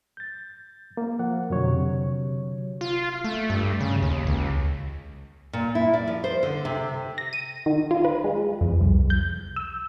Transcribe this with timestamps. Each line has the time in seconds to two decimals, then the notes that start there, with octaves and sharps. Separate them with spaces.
0.17 G6 A6
0.97 A#3
1.19 F3 F#5
1.50 F2 B2 D3 F#3 C#5
1.68 C3
2.81 F4
3.24 A3
3.50 G2
3.80 C#3
4.02 D#2
4.27 C#2
5.53 A#2
5.75 E4
5.94 D5
6.08 F3
6.24 C5
6.43 D3
6.65 C3
7.18 A#6
7.33 D#7
7.66 D#3
7.91 F4
8.05 B4
8.24 G#3
8.61 F2
8.81 C2
9.10 G6
9.56 E6